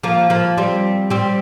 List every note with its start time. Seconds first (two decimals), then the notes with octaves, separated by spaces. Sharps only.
0.03 F3 A#3
0.30 F3 A#3
0.57 G3 C4
1.10 G3 C4